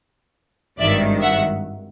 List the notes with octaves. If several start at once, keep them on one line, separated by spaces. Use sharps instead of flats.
G#1 G2 D#3 D5 E5
E5 F#5